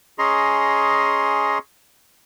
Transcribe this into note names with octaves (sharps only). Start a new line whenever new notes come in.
C#4 G#4 D#5 A#5 C6